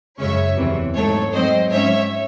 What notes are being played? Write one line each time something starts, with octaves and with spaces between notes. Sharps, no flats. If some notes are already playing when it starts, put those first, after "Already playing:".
F#2 C#3 G#3 C#4 C#5 E5
E2 C3 E3
G#2 F#3 A3 A4 C#5
G#2 F#3 C4 C5 D#5
G#2 F#3 C#4 C#5 E5